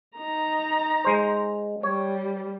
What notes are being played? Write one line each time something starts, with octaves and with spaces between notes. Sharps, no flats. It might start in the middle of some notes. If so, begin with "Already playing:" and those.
D#4 A#5
G#3 C5
G3 C#5